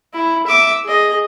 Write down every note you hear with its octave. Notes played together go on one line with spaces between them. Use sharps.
E4
E5 D6
G#4 D#5